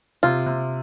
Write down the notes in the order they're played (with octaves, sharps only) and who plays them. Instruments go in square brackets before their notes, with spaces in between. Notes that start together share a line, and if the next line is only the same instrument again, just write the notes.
[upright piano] C3 [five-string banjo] F4
[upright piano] C3